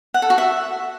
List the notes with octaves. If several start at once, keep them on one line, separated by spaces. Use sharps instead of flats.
F#5
A4
F#4
E5